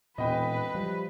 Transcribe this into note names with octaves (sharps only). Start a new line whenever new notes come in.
E1 A#2 B3 C4 B4 D#5 G5
F3 G3